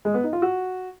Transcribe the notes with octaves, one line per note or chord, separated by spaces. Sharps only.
G#3
B3
D#4
F4
F#4